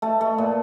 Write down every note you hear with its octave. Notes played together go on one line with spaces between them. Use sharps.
A3 A5
A3
A#2